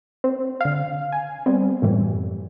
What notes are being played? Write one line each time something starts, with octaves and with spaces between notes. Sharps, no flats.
C4
D3 F5
G#5
G3 B3 C4
F#2 A2 E3 G3